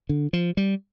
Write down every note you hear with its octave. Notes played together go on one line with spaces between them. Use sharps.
D3
F3
G3